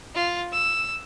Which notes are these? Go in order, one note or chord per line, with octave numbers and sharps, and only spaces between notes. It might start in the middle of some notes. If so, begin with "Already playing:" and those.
F4
E6